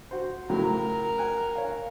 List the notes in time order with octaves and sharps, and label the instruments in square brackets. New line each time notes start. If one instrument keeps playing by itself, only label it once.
[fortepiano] F#4 C5
[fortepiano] A2 C#3 F#3 [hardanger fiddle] A#4
[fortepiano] F#5 G#5 F#6
C#5 F5